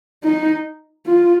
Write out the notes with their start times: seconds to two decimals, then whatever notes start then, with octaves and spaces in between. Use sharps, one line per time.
0.24 D#4
1.06 F4